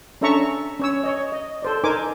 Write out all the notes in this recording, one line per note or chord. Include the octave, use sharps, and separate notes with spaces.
C#4 D4 A4 E5 A#5 C#6
C#4 C#5 E6
C#5 D#5
D#5
A4 C5 D5
D#4 A#4 C5 G#5 D6